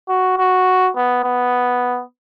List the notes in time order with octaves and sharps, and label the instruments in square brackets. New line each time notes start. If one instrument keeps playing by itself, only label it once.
[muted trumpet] F#4
F#4
B3
B3